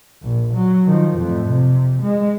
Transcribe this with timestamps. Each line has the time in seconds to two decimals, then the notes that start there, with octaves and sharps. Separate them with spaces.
0.22 A#1
0.54 F#3
0.86 D#3 F3
1.17 F2 A2
1.48 C3
2.02 G#3